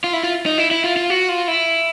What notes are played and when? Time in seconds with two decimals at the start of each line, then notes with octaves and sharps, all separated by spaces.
0.04 F4
0.13 E4
0.23 F4
0.46 D#4
0.58 E4
0.71 E4
0.84 F4
0.97 F4
1.10 F#4
1.29 F4
1.48 E4